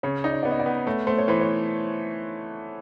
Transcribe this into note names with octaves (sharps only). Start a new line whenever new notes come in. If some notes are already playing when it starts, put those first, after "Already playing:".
C#3 C#5
D#4 D5
D#5
B3 D5
D#5
D5
B3
A3 C#5
A3 C5
C#5
E3 C5
C#5